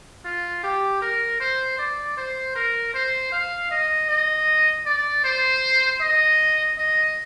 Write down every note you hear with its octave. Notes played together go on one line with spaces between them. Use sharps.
F4
G4
A#4
C5
D5
C5
A#4
C5
F5
D#5
D#5
D5
C5
D#5
D#5